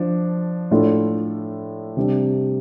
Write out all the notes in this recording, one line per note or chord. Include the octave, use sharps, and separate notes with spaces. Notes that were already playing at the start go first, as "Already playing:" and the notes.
Already playing: F3 D4
A2 A3 D4 F4
C3 G3 D4